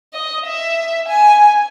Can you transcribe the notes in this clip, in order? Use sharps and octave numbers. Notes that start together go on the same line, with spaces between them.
D#5
E5
G#5